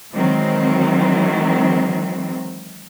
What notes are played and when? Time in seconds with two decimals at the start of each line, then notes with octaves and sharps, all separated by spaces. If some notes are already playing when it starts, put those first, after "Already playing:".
0.15 D#3 E3 F#3 G#3 C4